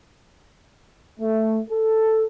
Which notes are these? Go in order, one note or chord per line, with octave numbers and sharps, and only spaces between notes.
A3
A4